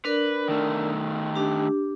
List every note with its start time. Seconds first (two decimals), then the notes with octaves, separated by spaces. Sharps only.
0.05 D4 A#4 B4 D5
0.48 D#3 A3
1.35 D4 G4